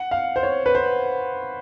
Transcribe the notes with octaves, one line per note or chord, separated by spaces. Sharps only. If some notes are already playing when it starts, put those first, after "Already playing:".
Already playing: F#5
F5
C5
C#5
B4
C5